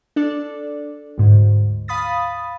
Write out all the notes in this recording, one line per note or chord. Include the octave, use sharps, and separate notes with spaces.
D4 A4 D5
D2 G#2
F5 B5 D#6 A6